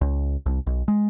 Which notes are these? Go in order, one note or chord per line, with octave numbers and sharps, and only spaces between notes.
C#2
C2
B1
G#3